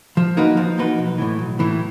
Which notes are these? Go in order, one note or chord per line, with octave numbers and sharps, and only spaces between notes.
F3
A#3 D#4 F#4 B4
F3
A#3 D#4 F#4 B4
B1
A2 E3
B1
A2 E3